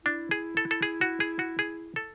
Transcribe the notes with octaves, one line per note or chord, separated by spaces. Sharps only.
D4 E4
G#4
A4
A4
G#4
F#4
G#4
F#4
G#4
A4